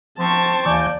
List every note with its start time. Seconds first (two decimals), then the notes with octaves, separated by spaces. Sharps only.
0.19 F3 C4 A5 C#6
0.66 D#2 E3 D5 G#5 G6